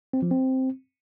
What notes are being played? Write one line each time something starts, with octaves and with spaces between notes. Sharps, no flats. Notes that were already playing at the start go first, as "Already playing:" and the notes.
C4
F3
C4